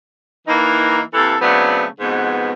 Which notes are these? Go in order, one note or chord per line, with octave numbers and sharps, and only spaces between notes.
E3 A#3 D#4
C3 E3 A#3 A4
C#3 F#3 A3 B3 C4 D4
F2 G#2 B2 B3